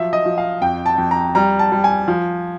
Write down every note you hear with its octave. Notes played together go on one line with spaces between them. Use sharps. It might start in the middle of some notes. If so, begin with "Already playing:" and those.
Already playing: F3 F#3 E5
D#5
F3
F5
F2 G5
A5
F2
A#5
G3 A#5
A5
G3
G#5
F3